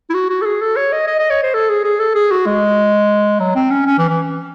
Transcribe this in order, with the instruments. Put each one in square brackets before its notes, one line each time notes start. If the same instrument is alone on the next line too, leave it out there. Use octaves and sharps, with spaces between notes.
[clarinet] E4
F#4
F#4
A4
G#4
A4
C#5
D#5
D#5
D#5
C#5
C5
A4
G#4
G#4
A4
G#4
F#4
G#3
F#3
C4
C#4
C#4
E3
E3